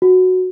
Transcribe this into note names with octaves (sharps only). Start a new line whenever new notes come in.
F#4